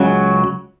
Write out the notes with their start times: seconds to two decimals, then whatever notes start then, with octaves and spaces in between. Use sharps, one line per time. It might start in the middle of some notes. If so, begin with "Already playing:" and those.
Already playing: C#2 C#3 F#3